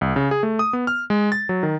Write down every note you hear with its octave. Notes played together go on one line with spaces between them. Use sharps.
C2
C#3
G#4
A3
D#6
B3
F6
G#3
A6
F#3
D#3